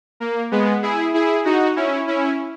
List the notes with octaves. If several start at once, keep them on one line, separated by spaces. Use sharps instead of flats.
A#3
G#3 B3
E4 G#4
E4 G#4
D#4 F#4
C#4 E4
C#4 E4